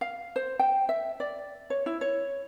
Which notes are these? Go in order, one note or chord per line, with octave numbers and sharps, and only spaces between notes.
F5
C5
G5
E5
D5
C#5
E4
C#5